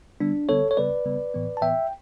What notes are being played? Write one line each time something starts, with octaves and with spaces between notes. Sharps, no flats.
D3 G3 B3 D4
D3 G3 B3 A4 C#5
C#5
C#3 G3 B3 B4 D5
C#3 G3 B3
A2 E3 B3
A5
A2 E3 B3 E5 G5